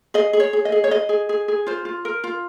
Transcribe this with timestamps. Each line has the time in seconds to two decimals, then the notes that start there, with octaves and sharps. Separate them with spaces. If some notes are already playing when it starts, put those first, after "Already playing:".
0.14 G#4 D#5
0.33 G#4
0.40 C#5
0.53 G#4
0.65 D#5
0.72 G#4
0.84 C#5
0.91 G#4 D#5
1.09 G#4
1.29 G#4
1.48 G#4
1.67 F4 C5
1.85 F4
2.05 A#4
2.24 F4